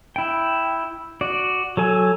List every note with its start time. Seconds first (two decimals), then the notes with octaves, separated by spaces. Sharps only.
0.16 E4 G5
1.21 F#4 D5
1.77 F#3 A4 G#5